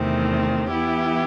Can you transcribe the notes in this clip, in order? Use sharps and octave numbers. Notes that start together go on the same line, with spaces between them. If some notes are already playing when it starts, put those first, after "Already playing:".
Already playing: E2 C3 D#3 A3 C4
E3 B3 E4 G4